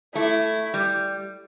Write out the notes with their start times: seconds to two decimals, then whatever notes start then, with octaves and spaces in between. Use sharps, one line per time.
0.15 A3 E4
0.74 G3